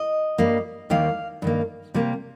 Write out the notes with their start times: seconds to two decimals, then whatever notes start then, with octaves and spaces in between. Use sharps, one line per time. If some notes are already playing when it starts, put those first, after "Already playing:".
Already playing: D#5
0.38 G2 G3 A#3
0.90 D#2 D#3 G3 A#3 F5
1.42 G2 D#3 A#3
1.94 C3 G3 A#3